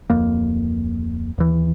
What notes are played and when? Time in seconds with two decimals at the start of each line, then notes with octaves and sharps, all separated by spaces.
0.10 D1 F2 A#3
1.38 D#2 E3